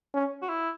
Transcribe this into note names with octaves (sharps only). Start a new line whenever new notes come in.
C#4
F#4
E4